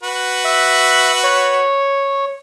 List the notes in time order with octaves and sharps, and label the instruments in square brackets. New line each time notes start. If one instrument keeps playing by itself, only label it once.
[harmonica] F#4 B4
[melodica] E5
C#5